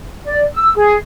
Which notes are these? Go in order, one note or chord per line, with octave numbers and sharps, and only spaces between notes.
D5
E6
G#4